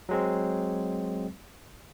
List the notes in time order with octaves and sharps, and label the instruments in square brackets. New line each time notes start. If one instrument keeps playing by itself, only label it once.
[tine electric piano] F#3 G#3 C4